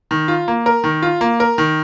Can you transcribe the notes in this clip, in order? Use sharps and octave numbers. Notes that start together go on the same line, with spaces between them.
D#3
F4
A#3
A#4
D#3
F4
A#3
A#4
D#3